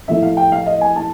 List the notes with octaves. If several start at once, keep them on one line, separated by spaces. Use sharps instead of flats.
A2 F3 A3 E5
F5
G5
F5
D#5
G#5
A5